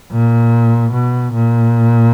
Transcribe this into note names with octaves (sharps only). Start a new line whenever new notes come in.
A#2
B2
A#2